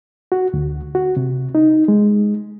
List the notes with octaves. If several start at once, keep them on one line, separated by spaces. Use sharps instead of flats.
F#4
D2
F#4
C3
D#4
G#3